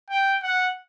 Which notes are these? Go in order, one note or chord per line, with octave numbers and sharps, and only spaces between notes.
G5
F#5